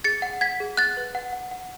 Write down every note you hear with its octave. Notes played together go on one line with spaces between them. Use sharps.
G#4 A6 C#7
F#5
F#5 G#6 B6
G#4
F#5 F#6 A6
B4
F#5
F#5
F#5